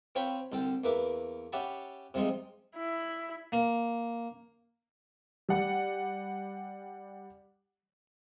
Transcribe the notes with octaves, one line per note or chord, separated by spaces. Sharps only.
C4 F4 C5 C#5 G5 B5
C2 D3 A4 G5
E2 A#3 A#4 B4 E5 D6
C#4 G4 E5 F#5 A5 B5
C3 F3 G3 G#3 D#4
E4
A#3
G3 F#5